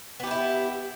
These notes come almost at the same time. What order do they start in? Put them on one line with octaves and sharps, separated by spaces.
B3 G4 D#4 E4